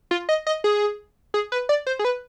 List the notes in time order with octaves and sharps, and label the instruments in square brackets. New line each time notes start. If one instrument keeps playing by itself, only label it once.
[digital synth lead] F4
D#5
D#5
G#4
G#4
B4
D5
C5
G#4
B4